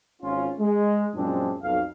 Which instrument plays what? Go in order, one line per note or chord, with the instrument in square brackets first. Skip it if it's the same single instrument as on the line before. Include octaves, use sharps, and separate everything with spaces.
[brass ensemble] G#1 C#4 F4
G#3
F#2 A#2 F3 G#3 C4 D4
B1 F2 F5